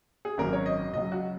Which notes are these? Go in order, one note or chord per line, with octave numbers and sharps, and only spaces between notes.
G#4
G#1 F#2 F#3 A#4
C#5
D#5
C#2 C#3 F#3 D#5
F#4